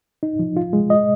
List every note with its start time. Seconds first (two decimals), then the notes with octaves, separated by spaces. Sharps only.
0.23 D#4
0.39 F3
0.57 F4
0.73 G#3
0.90 D#5